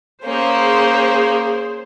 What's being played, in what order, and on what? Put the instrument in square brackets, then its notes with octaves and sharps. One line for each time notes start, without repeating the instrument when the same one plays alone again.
[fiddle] A#3 C#4 [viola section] G#4 C5